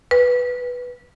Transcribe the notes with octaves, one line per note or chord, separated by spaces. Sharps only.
B4